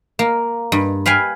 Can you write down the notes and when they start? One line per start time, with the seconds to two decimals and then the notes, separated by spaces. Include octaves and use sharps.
0.19 A#3
0.72 G2
1.06 B4 F5 G5 G#5